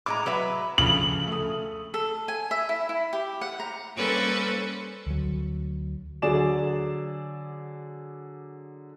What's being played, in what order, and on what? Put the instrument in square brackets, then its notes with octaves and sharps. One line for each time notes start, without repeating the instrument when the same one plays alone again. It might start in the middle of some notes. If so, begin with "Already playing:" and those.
[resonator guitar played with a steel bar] A2 G#3 A#5 [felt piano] D6
[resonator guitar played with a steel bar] F#3 B4 E5
[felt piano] D2 F3 [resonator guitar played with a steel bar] C#3 [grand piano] F#7
[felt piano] A3 D#6
[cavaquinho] A4
G#5
E5
E4
E4
G4
F#5
A#5
[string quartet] G3 A#3 C#4 A4 B4 C5
[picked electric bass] D2 F#3
[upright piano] D3 F#3 G#4 D5 E7